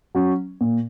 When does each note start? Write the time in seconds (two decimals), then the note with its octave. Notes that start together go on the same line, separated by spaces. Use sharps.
0.15 F#3 C#4
0.61 A#2